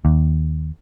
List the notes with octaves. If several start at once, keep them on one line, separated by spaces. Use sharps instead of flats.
D#2